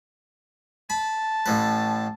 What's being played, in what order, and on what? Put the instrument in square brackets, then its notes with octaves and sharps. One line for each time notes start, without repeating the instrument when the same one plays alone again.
[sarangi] A5 [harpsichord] B5
[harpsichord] A1 A2 B4